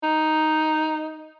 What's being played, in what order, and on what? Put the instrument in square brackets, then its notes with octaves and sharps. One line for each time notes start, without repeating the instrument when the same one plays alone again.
[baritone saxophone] D#4